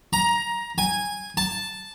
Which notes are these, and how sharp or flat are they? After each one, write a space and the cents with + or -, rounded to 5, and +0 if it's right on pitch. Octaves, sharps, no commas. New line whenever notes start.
A#5 +15
G#5 -10
A5 -5